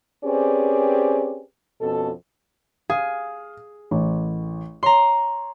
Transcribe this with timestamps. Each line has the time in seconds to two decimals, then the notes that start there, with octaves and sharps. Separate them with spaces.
0.24 C4 C#4 G4 G#4 B4 D5
1.80 F2 B2 C#4 A4
2.90 G#4 F5
3.91 A1
4.83 C#5 A#5 C6